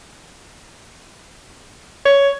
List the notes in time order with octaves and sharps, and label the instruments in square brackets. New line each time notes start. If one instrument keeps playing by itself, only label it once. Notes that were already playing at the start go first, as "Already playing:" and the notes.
[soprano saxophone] C#5